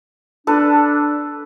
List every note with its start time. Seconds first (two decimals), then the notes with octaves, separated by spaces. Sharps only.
0.47 D4 A4 B4